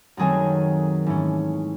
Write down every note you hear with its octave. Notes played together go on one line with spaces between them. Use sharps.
F#2 D#3 F#3 A3 C4 G#4 G#5
G#2 E3 A3 C#4